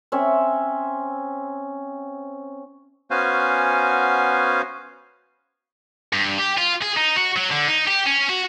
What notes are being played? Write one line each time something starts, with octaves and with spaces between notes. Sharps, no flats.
C4 C#4 E5
B3 C#4 F#4 C5 F5 G#5
G2
G4
F4
G#4
D#4
F#4
F#3
D3
D#4
G4
C#4
F#4